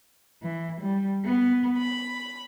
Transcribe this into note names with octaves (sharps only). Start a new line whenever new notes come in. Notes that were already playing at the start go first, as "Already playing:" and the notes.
E3
G3
B3
B5